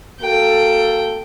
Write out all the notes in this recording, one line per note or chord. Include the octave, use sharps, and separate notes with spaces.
A#3 F#4 A4 G5